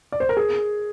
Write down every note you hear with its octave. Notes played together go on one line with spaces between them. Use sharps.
D5
C5
A#4
G#4